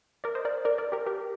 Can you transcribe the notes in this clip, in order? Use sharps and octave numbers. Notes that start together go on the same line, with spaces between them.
A#4 D5
C5 D#5
A#4 D5
A#4 D5
A#4 D5
G4 A#4
G4 A#4